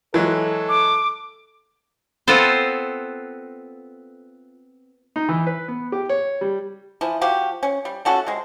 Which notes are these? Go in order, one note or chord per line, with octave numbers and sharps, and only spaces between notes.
E3 F#3 G#3 A4
D6
B3 C4 F4 A4 C5
D#4
E3
B4
B3
G4
C#5
G3
E3 F3
F3 F#4 G4
C#4
G3
A3 C#4 F#4 A4
C3 G#3